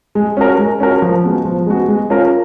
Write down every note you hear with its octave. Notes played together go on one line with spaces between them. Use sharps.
G#3
C#4 F#4 A#4
G#3
C#4 F#4 A#4
F3
G#3 B3 F#4
F3
G#3 B3 F#4
G#3
C#4 F4 A#4